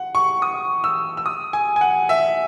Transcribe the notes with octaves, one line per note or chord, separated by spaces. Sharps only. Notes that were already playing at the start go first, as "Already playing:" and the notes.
Already playing: F#5
C#6
D#6
E6
E6
D#6
G#5
G#5
F#5
E5